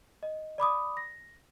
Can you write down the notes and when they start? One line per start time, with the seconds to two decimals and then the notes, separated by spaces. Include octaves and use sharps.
0.23 D#5
0.58 D5 B5 D6 D#6
0.97 A#6